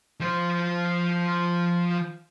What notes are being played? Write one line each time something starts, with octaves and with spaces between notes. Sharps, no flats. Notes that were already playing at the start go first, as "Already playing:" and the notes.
F3 C5